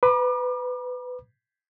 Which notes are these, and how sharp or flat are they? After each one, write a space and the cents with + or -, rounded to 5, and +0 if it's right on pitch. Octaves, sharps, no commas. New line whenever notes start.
B4 +20 B5 -45 D6 +35